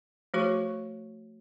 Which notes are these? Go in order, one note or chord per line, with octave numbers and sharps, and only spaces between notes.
F3 A3 F#4 C5 C#6